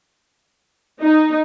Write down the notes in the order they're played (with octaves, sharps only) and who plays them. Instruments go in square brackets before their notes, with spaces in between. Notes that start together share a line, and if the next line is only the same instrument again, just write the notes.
[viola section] D#4